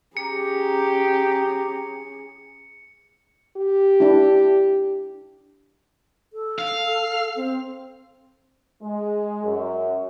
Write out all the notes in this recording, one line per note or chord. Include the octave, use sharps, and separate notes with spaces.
C#4 G4 G#4 A#5 C#7
G4
D4 E4
A4
F5
C4
G#3
F#2